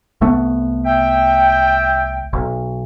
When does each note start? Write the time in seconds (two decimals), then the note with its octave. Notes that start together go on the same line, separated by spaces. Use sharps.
0.21 C2 A3 B3
0.85 E5 G5
2.33 B1